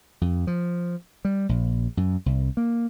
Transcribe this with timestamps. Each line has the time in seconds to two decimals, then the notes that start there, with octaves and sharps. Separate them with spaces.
0.21 F2
0.47 F3
1.25 G3
1.49 A#1
1.97 F#2
2.26 C2
2.57 A#3